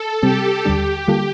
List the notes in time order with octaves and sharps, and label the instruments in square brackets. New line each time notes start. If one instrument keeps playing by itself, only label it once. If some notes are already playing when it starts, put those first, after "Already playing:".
Already playing: [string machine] A4
[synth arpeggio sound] C3 G3 C4 [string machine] G4
[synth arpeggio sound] D#2 D3 G3 D4 [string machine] G4
[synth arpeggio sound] D3 G3 A#3 F4 A4